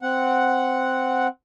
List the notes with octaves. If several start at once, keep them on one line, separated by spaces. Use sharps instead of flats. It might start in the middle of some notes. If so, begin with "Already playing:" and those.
C4 F#5